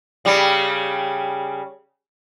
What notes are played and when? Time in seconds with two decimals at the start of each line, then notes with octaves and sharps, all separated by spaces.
0.25 C#3 G3